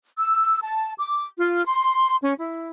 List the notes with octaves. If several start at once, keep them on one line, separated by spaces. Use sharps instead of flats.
E6
A5
D6
F4
C6
C#4
E4